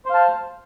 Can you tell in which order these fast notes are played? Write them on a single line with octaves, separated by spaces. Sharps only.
C5 F5 A5